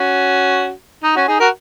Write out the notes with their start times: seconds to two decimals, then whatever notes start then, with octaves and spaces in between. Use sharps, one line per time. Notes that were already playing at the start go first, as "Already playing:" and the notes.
Already playing: C#4 F#4
1.03 D#4
1.15 C#4 F#4
1.28 D#4 G#4
1.40 F#4 A#4